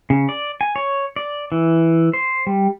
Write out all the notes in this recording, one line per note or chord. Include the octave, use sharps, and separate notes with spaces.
C#3
D5
G#5
C#5
D5
E3
C5
G3